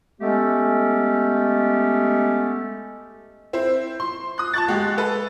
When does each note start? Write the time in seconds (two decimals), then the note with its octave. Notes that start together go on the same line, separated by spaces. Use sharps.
0.19 G#3 A3 B3 C#4 G4 A4
3.53 C4 E4 C5
4.00 C6
4.38 D#6 F#6
4.54 A5 C#6 F#6 A6
4.68 G#3 F#4 G4
4.98 A4 B4